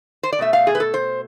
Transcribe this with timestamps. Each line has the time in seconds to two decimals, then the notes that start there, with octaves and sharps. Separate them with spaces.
0.23 C5
0.32 D5
0.39 B2 A3 E5
0.53 F5
0.67 G#4
0.75 B4
0.80 A4
0.94 C5